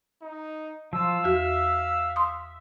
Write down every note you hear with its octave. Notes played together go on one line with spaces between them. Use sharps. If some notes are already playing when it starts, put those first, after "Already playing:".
D#4
F3 F4 F5 E6
E2 F#4 E5
C6 D#6